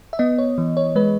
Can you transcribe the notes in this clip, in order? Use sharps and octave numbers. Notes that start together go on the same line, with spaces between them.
E5
B3 D#5
C#5
E3
C#5
G#3 B4